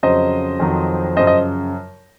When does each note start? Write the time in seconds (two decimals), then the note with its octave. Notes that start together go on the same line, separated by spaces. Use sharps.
0.03 F2 C#3 F#3 C5 D#5
0.60 F2 D#3 F#3
1.17 F#2 C#3 F3 C5 D#5
1.27 D#5